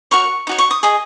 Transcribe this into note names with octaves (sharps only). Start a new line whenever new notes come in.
F#4 A#4 C#5 C#6
D#4 F#4 C#5
C#6
D#6
G#4 D#5 D#6